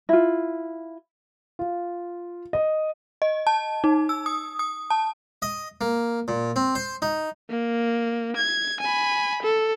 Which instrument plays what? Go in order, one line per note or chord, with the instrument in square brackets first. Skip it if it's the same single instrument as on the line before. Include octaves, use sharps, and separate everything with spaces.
[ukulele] E4 F4
[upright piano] F4
D#5
[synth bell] D#5
A5
D#4
E6
D#6
D#6
A5
[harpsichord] D#5
A#3
A#2
C4
C5
D#4
[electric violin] A#3
G#6
G#5 B5
A4